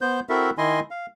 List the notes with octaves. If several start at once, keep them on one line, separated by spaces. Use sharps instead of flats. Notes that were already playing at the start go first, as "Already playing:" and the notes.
B3 C5 G6
C4 E4 F#4 A4 A#4 E5
D#3 E4 D#5 G#5 C6
F5